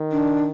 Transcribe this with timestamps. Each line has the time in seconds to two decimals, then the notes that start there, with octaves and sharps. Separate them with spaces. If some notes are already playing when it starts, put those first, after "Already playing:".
Already playing: D#3
0.12 D4